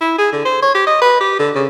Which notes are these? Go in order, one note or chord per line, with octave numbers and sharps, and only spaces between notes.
E4
G#4
D3
C5
C#5
G4
D#5
B4
G4
D3
C#3